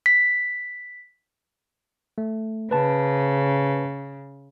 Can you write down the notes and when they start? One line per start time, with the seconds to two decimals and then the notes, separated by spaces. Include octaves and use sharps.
0.06 B6
2.18 A3
2.71 C#3 B4 A5